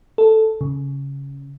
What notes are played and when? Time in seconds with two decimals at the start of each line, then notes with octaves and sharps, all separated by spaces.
0.18 A4
0.61 C#3